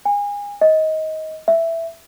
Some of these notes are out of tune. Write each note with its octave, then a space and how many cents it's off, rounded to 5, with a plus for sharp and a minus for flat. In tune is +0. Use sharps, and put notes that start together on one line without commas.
G#5 -30
D#5 +20
E5 +5